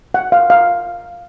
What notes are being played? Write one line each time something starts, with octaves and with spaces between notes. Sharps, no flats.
F#5
F5
F5